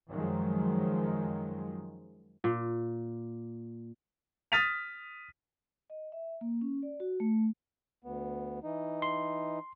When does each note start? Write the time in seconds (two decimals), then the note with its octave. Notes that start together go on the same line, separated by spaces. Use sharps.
0.10 F#2 D#3 F3 F#3 G#3
2.44 A#2
4.52 D#6 F6 A6 B6 D#7 F7
5.90 D#5
6.12 E5
6.41 A#3
6.61 C#4
6.83 D5
7.00 F#4
7.20 A3
8.04 D2 B3
8.64 E3 D#4
9.02 C6